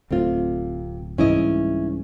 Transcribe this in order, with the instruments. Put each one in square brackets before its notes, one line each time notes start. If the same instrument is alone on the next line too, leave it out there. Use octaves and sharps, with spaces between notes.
[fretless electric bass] D1 A3 C4 [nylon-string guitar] C3 F4
[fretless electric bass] C2 G#2 E3 [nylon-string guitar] C#4 E4 D#5